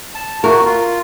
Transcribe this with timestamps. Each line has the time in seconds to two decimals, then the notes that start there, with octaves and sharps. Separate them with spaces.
0.15 A5
0.44 A3 A#3 F#4 A#4
0.65 F4